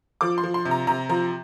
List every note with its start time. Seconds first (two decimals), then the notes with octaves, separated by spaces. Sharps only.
0.21 F3 D6
0.38 C6
0.44 F3
0.54 C6
0.65 C3
0.71 A#5
0.87 C3 A#5
1.09 F3 A#5